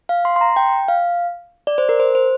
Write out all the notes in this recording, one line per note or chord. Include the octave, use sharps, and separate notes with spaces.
F5
C6
C6
A#5
G5
F5
D5
C5
A#4
C5
C5